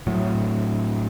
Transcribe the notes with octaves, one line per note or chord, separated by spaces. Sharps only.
A2 F#3